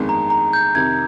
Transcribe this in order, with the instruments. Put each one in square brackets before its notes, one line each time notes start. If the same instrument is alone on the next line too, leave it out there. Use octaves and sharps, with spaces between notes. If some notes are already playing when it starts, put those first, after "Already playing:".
Already playing: [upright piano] G1 F2 D#3 G#3
[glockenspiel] A#5
A#5
G6
[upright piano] F2 C3 D#3 [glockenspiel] G#6